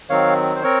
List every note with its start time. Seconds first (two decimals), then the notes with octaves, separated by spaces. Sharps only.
0.10 D#3 F#3 C4 C#5 F5
0.56 C5
0.63 C4 A#4 C#5